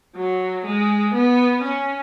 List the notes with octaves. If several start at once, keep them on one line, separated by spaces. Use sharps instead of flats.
F#3
G#3
B3
C#4